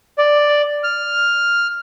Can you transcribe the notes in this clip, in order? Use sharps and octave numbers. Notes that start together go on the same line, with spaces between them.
D5
F6